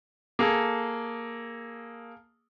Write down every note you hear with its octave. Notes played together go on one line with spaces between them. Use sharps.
A#3 G#4 A4